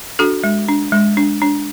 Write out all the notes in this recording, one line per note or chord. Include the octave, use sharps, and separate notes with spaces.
D4 F#4 A4
G#3
D4
G#3
D4
D4